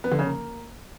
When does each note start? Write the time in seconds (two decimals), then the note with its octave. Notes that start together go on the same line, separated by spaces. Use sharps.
0.04 B3
0.11 D3
0.19 C#3
0.26 A#3